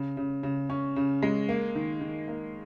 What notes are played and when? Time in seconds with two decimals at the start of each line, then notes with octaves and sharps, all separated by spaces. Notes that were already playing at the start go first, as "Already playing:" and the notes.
Already playing: C#3
0.17 C#3
0.43 C#3
0.70 C#4
0.96 C#3
1.23 G#3
1.49 A#3
1.75 D#3
2.01 D#3
2.28 A#3